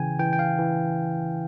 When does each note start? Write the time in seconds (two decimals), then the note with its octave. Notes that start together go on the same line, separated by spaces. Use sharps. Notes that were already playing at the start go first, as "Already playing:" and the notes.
Already playing: C#3 E3 G5 G#5
0.19 E3 G5
0.33 G5
0.39 F5
0.59 E3